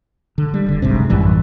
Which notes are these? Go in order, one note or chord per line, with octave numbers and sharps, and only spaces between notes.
D3
G3
F1 D3
F#1 B1 G#2 C3
A1 F#2 E3 G3